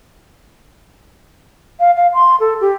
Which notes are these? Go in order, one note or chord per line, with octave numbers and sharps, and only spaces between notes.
F5
F5
C6
A4
G4